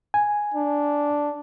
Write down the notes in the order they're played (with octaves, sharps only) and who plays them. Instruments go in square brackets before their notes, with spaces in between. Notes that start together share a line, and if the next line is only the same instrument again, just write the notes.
[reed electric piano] G#5
[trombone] D4